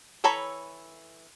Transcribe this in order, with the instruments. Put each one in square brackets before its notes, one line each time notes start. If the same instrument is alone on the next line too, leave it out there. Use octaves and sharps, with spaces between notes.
[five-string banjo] E3 A4 C#5 A#5 B5